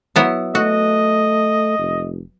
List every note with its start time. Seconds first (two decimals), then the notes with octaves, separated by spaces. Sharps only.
0.16 F#3 B3 E4
0.55 A3 F#4 D#5
1.79 F1